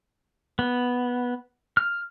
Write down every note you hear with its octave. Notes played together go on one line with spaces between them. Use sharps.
B3
F6